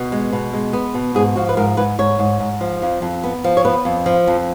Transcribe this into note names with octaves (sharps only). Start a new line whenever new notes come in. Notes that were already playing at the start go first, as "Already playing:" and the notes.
Already playing: B2
G#3
B2
G#3
B3
B2
G#2 G#4
F3 F#4
B4
G#2 A#4
G#2 B4
G#2 C#5
G#2
G#2
F3
F2
F2
B3
F3
C#5
B3 B4
F2
F3
F2